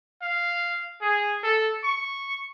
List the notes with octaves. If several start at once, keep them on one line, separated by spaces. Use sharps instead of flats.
F5
G#4
A4
C#6